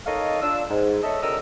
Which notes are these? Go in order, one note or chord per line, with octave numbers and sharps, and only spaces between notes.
D#4 A4 A#4 C#5 D#5 F5
D4 F4 E6
G#2
A4 C#5 D#5 E5
D3 F#3 C4 A#4 D#5 E6